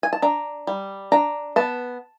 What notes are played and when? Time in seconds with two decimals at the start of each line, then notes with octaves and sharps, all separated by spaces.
0.03 G#5
0.13 A5
0.22 D4 A#5
0.67 G3
1.12 D4 A#5
1.56 B3 A5